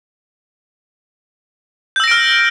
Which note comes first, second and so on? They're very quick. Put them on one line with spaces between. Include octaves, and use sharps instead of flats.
G6 E6 A#6 D7 F6